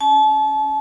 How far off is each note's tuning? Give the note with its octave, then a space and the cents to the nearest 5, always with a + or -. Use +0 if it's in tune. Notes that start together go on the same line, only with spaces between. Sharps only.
C#4 +0 A5 -35